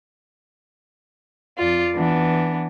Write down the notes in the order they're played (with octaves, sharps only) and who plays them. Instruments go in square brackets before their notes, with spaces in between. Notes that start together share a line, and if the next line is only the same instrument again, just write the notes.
[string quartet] F2 F4 D5
E3 B3 D4